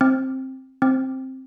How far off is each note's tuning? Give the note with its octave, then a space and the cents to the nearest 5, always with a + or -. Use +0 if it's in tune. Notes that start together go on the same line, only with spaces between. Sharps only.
C4 +10
C4 +5